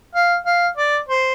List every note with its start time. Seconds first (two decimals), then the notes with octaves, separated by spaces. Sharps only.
0.15 F5
0.46 F5
0.77 D5
1.08 C5